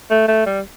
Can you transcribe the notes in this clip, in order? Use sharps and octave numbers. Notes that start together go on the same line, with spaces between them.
A3
A3
G3